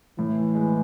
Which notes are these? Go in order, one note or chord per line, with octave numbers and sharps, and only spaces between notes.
A2 E3
G#3